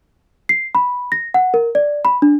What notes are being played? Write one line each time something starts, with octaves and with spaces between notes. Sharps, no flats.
C7
B5
A#6
F#5
A#4
D5
B5
D4